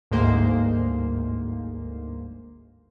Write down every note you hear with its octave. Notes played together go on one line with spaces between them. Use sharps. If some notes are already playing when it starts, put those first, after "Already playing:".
G1 D2 G#2 A#3 C5